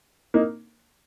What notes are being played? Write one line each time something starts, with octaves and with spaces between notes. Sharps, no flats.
A#3 D#4